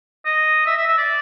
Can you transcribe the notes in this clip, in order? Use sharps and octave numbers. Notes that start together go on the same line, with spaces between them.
D#5
E5
E5
E5
D5